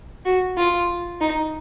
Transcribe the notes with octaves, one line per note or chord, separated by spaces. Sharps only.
F#4
F4
D#4